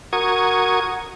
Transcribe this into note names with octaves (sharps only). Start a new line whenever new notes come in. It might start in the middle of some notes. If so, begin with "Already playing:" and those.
F#4 A#4 C#6 D#6 G#6